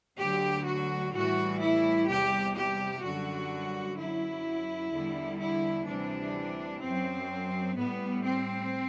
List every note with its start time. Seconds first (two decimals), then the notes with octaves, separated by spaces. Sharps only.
0.17 D2 D3 F#3 G4
0.65 F#4
1.12 A2 E3 G3 F#4
1.60 E4
2.08 E2 C3 G3 G4
2.55 G4
3.02 F#2 D3 G3 F#4
3.97 F#2 F#3 E4
4.91 E2 D3 G3
5.39 E4
5.86 D2 C3 E3 G3 D4
6.81 F#2 F#3 C4
7.76 A2 G3 B3
8.23 C4